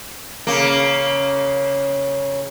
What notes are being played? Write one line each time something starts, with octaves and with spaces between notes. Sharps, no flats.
C#3 A#3